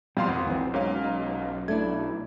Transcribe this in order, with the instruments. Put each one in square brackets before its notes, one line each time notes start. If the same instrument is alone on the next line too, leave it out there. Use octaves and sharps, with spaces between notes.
[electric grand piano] F2 F5 C6 [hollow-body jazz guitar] B2 [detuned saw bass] G3
[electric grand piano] G#1 F#5 [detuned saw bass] F2
[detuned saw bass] B1 [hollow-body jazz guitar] E3 C4
[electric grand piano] G#2 F5 [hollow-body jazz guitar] F#3 C#4 A#4
[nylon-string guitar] D#4
[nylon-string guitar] A3 D4 E4 [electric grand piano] G#6